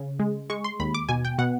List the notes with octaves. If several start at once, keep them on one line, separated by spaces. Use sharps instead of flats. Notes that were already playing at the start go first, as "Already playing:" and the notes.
Already playing: C#3
G#3
G#3 C#6
C6
D#2 B5
D6
B2 G#5
G5
B2 F#5